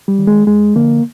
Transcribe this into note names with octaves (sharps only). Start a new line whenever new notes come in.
G3
D#3
G#3
F2 G#3
D3 F3 A#3